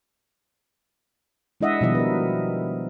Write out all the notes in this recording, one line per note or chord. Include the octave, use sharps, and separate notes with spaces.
G#3 D4 E4 D#5 E5 F#5
B2 D#3 F3 G3 E4 D#5
A#4 B4